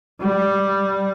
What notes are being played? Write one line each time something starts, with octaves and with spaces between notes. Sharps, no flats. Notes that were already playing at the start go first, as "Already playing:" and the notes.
G3